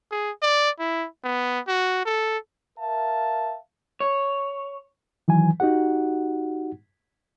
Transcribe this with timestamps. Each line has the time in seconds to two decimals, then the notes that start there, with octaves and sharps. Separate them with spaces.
0.11 G#4
0.42 D5
0.79 E4
1.24 B3
1.68 F#4
2.05 A4
2.77 A#4 E5 F5 A5
4.00 C#5
5.28 D#3 E3 F#3 G#5
5.60 D#4 F#4 G4 F#5